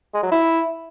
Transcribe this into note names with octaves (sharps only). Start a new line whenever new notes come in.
G#3
F#3
E4